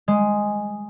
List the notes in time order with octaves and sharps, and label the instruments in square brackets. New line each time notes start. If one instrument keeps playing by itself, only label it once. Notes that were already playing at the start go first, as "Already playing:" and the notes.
[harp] G#3